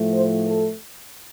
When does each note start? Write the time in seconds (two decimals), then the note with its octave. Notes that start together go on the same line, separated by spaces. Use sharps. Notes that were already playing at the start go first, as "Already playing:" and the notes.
Already playing: A2 F3 A3
0.11 C5
0.46 A4